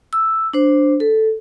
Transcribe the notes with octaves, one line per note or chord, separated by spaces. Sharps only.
E6
D4 C5
A4